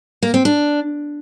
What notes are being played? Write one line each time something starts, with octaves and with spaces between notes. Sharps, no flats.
A#3
C4
D4